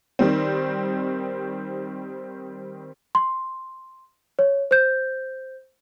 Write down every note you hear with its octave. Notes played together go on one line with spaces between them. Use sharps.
D#3 G3 C4
C6
C#5
C5 G6